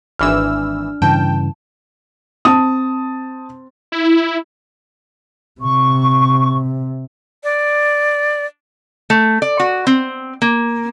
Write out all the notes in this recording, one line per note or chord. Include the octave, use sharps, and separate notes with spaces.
G#1 E3 D4 E6 F6
G2 C#3 E3 G5 A5
C4 A5 D#6
E4
C3 C#6
D5
A3
D5
F#4
C4
A#3